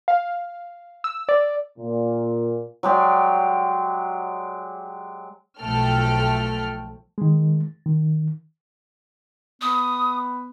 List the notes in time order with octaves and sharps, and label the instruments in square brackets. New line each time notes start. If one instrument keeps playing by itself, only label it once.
[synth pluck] F5
E6
D5
[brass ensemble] A#2
[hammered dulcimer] F#3 G#3 G4 D5
[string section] B1 F3 A3 A4 G5 F6
[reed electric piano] D#3 G#3
D#3
[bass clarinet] B3 [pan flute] D#6